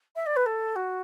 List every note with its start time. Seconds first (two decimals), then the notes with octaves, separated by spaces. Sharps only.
0.16 E5
0.26 D5
0.36 B4
0.46 A4
0.76 F#4